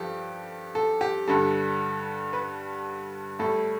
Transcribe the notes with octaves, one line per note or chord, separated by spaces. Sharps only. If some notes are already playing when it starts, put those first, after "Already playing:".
Already playing: G2 F3 G4 A4
A4
G4
G2 D3 G3 A4
B4
A2 G3 A4